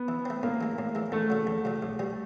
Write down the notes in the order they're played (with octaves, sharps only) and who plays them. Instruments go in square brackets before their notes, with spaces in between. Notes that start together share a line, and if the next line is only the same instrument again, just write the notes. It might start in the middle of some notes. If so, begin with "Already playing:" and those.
Already playing: [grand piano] B3
[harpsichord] E3
A3 C4
[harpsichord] A2 [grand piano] A#3
[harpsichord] E3 G#3
A2
E3 G#3
[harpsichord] E2 [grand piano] A3
[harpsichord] C#3 F#3
E2
C#3 F#3
B1
B2 G3